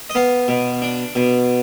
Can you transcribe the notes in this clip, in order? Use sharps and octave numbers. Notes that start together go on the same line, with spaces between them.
D#5
B3 F5
B2
D4
B2